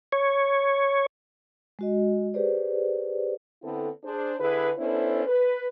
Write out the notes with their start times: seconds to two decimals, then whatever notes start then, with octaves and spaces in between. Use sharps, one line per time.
0.12 C#5
1.79 G#3 F#4 D#5
2.34 G4 G#4 B4 C5 D5
3.63 D3 B3 C4 E4 A4
4.03 D4 G#4 C5
4.39 D3 E4 G#4 B4
4.78 B3 C#4 D4 E4 A4 C5
5.25 B4